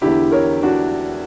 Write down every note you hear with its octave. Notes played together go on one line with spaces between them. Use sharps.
E2 D3 E4 G4
A#4 C#5
D4 F#4